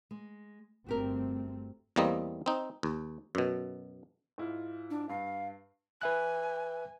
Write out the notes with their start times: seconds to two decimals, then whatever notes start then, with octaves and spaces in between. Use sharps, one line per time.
0.11 G#3
0.86 G1 A3 C4 F#4 G4 A#4
1.96 E2 G3 A#3 C4 D#5
2.46 C4 D#4
2.83 D#2
3.35 F#2 B2
4.38 G#2 E4 F4
4.90 D4
5.09 G2 F5
6.01 B4 E5 G#5 F#6